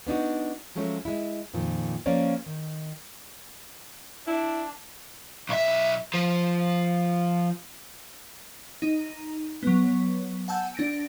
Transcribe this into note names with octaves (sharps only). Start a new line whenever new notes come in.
B3 D4 D#4 F#4
F3 F#3 G#3 A3 C#4
G#3 E4
F2 A#2 D#3 F3
F3 A#3 C#4 C#5 D5
D#3
D4 E4
B1 E5
F3
D#4
F#3 B3
F#5 G#5 A5 E6 G6
D4 A#6 D7